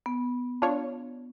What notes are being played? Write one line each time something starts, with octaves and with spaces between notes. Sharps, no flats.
B3
D4 F4 C#5